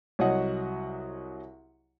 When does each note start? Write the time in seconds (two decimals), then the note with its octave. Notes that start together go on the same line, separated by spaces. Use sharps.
0.19 C2 F#3 C#5 D#5 F#5